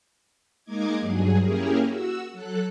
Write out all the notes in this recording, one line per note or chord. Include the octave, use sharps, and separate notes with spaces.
G#3 A#3 D#4 D#5 D6 G#6
G2 F#3 G#4
A#3 C#4 E4 G4 G#4 A#4
F#4 E6
F#3 A4 F#6